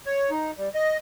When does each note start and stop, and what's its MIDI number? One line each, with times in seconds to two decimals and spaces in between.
0.06 0.30 73
0.30 0.51 63
0.58 0.68 55
0.74 0.97 75